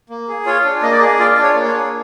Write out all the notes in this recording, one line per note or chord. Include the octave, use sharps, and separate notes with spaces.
A#3
G#4
F4 C#5
D4
A#3 D#5
D5
D#5
G#4
F4 D5
D4
C#5
A#3
C#5
G#4